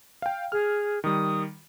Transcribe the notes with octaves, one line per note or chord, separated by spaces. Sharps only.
F5 G5
G#4 F6
D#3 G3 D#6